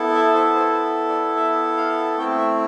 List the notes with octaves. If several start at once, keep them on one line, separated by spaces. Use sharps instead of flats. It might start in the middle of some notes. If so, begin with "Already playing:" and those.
Already playing: B3 E4 A4
E5
C5
C5
D5
E5
F5
A3 C4 E4 G5
E5